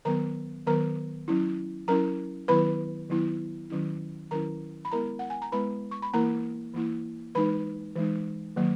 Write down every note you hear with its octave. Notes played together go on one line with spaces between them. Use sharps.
D#3 F#3 B3 A#4 A#5
D#3 F#3 B3 A#4 A#5
F#3 C#4 E4
F#3 C#4 E4 A#4 A#5
D#3 F#3 B3 E4 B4 B5
D#3 F#3 B3 E4
D#3 F#3 C#4 E4
D#3 F#3 C#4 E4 A#4 A#5
B5
G#3 B3 E4 A#4 A#5
F#5
G#5
A#5
G#3 B3 E4 B4 B5
C#6
B5
E3 A#3 E4 A#4 A#5
E3 A#3 E4
E3 G#3 D#4 B4 B5
E3 G#3 D#4
D#3 F#3 A#3